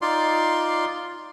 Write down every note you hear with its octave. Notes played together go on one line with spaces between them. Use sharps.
D#4 F4 D5 C6